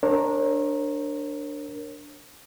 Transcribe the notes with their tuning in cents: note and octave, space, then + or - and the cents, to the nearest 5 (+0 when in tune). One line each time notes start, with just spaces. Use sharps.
D4 +0 A#4 +0 C#5 -40